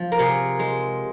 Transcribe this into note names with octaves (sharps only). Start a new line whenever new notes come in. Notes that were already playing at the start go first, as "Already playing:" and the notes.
Already playing: F3
A#4
C3 G#4
G#3